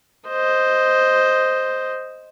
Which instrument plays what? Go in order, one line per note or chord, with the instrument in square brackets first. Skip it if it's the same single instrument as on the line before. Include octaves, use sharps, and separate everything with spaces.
[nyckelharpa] C5 D#5